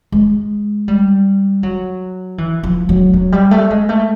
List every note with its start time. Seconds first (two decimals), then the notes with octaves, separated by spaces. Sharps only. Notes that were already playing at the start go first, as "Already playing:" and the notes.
0.12 G#3
0.88 G3
1.63 F#3
2.38 E3
2.63 F3
2.89 F#3
3.14 F#3
3.32 G3
3.51 A3
3.70 G#3
3.89 A3